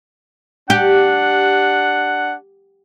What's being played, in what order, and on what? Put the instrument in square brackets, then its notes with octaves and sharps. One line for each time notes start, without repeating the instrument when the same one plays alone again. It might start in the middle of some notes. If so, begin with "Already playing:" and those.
[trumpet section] D4 F#5 [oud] G4